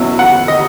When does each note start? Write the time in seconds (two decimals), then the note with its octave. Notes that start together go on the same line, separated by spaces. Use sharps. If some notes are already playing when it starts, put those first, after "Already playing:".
Already playing: E2 B2 F#3 C#4 E4
0.19 F#5
0.48 D#5